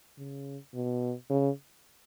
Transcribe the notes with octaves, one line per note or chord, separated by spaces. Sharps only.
C#3
B2
C#3